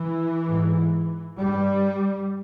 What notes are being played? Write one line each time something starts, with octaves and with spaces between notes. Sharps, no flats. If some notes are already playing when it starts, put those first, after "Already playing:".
Already playing: E3
G#2
G2 G3